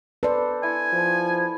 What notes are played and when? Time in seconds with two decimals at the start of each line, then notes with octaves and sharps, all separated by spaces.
0.23 A4 B4 C5 D5
0.63 E4 G#5
0.93 F3